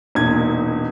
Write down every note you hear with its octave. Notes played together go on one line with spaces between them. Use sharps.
E1 A#2 D#4 G#6